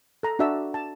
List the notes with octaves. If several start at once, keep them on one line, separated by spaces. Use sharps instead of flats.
A4 A#5
D4 F#4 D5 E5 A5 E6
A5